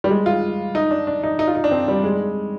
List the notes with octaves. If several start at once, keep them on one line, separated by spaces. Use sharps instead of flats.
G3
G#3
F4
D#4
D4
D4
D#4
D#4
F4
D#4
D4
C4
G3
G#3